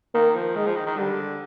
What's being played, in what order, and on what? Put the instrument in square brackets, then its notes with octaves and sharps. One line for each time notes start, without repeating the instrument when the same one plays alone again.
[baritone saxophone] D#3 [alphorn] A#3
[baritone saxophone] F3
[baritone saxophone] D#3 [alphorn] G#3
[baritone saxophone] F3
D#3
D#3
[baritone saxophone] D3 [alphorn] G3